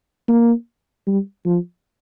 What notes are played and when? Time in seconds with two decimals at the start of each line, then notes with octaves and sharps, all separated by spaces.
0.28 A#3
1.06 G3
1.45 F3